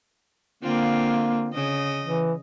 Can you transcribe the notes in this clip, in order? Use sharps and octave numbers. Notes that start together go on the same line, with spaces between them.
D3 A#3 C4 F4
C#3 D#5
E3